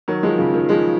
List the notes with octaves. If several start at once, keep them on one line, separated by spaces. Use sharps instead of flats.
D#3 F#3
F3 G#3
C#3 F3
D#3
F3 G#3